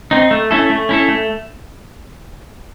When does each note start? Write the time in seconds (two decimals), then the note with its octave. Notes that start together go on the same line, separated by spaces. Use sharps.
0.11 C4 D#4
0.31 A3
0.51 C#4 E4 A4
0.70 A3
0.89 C#4 E4 A4
1.08 A3